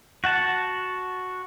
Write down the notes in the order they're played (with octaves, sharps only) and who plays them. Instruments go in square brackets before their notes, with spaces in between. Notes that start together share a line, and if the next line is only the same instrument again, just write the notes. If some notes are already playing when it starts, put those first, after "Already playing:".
[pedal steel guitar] F#4 F#5 A5